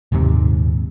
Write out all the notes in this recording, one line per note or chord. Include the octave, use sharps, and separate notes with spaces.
D#1 D#2 G#2 C3